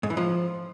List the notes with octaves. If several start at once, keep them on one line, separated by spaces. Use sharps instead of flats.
G#2
E3
F3